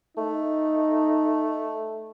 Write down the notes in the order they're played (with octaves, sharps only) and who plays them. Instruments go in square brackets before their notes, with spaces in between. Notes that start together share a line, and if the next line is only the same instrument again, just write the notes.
[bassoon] A3 [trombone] D#4